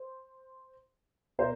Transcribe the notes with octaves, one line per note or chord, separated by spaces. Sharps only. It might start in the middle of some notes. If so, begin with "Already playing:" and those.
Already playing: C5
B2 A#4 C5